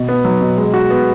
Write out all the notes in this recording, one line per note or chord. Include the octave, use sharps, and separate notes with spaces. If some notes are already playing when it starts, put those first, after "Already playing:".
Already playing: B2
B3
F#3
B2
G#3
F#4
B3